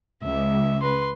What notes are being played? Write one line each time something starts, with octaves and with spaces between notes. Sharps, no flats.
C#2 E5
B4 C6